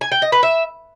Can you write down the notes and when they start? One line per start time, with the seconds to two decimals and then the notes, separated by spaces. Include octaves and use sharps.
0.01 G#5
0.12 G5
0.22 D#5
0.32 B4
0.43 E5